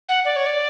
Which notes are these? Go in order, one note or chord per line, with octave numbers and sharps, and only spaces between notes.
F#5
D5
C#5
D5